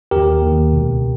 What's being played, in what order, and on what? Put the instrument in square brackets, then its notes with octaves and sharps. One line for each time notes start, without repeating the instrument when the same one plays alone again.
[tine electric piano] D#2 D#3 G4 A#4
D#2 D#3
C#2 B2